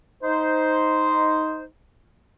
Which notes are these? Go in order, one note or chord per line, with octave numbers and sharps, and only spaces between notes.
D#4 C5